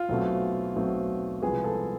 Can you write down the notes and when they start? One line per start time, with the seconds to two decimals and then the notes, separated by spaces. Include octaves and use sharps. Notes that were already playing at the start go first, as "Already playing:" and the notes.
Already playing: F4
0.09 B1 B2 A3 C4
0.76 B1 B2 A3 C4
1.42 C2 C3 F3 G#3 B3 G#4
1.64 A4